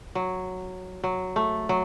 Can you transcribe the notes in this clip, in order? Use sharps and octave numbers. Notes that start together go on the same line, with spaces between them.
F#3
F#3
A3
F#3